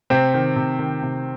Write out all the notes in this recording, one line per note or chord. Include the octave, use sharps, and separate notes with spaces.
C3 C4
D#3
C3
D#3
C3